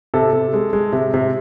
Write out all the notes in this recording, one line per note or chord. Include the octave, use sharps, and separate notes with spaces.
C3 A4
C3
G#3
G#3
C3
C3